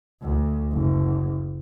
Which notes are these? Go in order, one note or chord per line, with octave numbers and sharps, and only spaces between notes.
D2
F#1